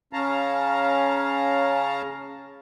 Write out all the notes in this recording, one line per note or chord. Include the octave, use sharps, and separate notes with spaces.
C#3 C#4 F5 A5 A#5